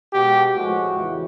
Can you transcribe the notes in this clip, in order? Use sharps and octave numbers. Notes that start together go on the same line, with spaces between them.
B2 G#3 G4
A2 F3 G#3 F#4
E2 C#3 E3